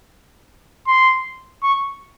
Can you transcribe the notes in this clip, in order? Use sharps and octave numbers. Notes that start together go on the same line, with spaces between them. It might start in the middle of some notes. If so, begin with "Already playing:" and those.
C6
C#6